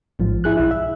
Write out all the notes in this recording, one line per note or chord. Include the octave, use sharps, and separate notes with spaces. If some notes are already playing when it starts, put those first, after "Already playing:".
A1 G#2 F3
E4 G#4 F#6
B1 E4
E5